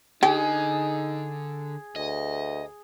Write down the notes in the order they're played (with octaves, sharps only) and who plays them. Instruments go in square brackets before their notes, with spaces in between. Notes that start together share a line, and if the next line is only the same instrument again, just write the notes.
[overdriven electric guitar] D3 [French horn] D#4 [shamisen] G4 [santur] G#4
[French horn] D2 [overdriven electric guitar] D#5